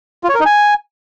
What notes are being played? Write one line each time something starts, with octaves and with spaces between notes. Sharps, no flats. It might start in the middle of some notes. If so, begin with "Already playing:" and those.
F4
C#5
A#4
D#4
G#5